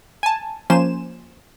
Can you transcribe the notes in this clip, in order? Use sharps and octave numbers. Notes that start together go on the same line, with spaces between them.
G#5 A5
F3 A#3 C#4 C5 G#5 E7